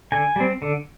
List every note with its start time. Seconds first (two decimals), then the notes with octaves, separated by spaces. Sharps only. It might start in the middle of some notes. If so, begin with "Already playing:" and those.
0.12 D3 G#5
0.36 G3 C4
0.62 D3